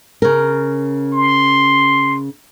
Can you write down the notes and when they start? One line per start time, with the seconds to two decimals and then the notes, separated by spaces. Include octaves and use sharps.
0.22 C#3 A#4
1.13 C6